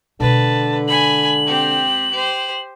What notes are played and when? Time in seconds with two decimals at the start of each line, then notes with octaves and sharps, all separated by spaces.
0.20 B2 D3 G#3 B4 A5
0.88 G#5 B5 F#7
1.46 C4 G4
2.11 G4 C5